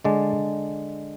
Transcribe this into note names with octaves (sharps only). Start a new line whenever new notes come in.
D3 G#3 D4 D5